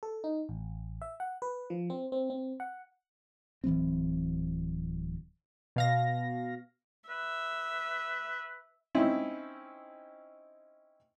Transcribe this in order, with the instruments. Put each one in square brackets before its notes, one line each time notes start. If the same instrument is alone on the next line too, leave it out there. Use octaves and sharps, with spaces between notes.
[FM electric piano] A4
D#4
A1
E5
F#5
B4
F3
C4
C4
C4
F#5
[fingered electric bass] D1 E3 F#3 C4
[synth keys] B2 F5 A#6
[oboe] B4 [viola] E5
[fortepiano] C4 C#4 D#4 E4